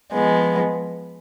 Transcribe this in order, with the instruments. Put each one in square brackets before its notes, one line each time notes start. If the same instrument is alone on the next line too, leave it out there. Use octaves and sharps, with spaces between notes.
[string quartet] F3 G#3 B3